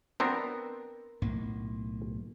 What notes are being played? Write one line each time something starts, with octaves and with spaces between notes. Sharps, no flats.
B3 C4 D4 A#4
B1 A2 A#3